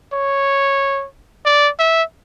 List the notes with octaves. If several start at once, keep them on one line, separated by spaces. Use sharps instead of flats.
C#5
D5
E5